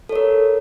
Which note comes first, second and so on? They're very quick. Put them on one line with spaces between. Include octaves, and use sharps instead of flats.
A4 C#5 A#4